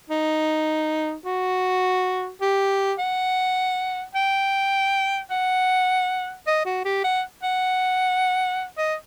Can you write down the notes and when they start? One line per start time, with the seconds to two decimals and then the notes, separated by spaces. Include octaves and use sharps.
0.10 D#4
1.25 F#4
2.41 G4
2.99 F#5
4.15 G5
5.30 F#5
6.47 D#5
6.66 F#4
6.85 G4
7.04 F#5
7.43 F#5
8.77 D#5